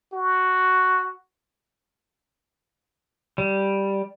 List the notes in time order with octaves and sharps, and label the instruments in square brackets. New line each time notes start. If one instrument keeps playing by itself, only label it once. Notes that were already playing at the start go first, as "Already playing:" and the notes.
[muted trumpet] F#4
[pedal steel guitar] G3